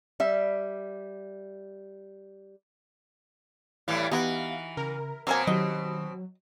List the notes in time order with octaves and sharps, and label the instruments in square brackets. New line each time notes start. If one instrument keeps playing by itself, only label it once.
[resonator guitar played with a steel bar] G3 E5
[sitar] A2 E3 G3 [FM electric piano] E4 [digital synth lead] F5
[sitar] E3 [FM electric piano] B3 G4 [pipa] D#4 F#4
[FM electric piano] C#3 [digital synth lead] A#4
[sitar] B2 C4 [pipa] F#3 A#3 G#5 [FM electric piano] D6 E6
[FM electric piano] D#3 G4 [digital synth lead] F#3 [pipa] D#5